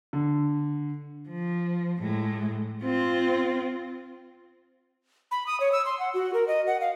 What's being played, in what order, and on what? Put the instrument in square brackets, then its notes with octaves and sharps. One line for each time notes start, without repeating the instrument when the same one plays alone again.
[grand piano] D3
[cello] F3
A2 G#3
C4 F4
[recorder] B5
D#6
C#5
E6
C6
F#5
F#4
A#4
D#5
F#5
F5